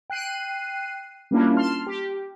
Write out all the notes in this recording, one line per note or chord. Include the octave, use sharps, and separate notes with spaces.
G5 F#6 C7 D#7
G3 A#3 C#4 D4 E4 F4
A5 C6 F6
G4